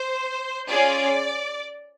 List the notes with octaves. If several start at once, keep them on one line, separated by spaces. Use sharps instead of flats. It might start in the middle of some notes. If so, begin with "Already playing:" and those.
Already playing: C5
C#4 F4 G#4 D5